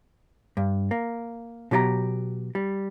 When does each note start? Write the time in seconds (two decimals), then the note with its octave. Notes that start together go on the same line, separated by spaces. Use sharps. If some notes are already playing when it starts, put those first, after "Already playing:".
0.57 G2
0.91 A#3
1.71 B2 F#3 G4 D#5 A#5
2.55 G3